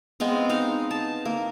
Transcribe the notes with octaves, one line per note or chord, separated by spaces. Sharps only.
G#3 B3 C4 F5
D#4 F5
A5
A#3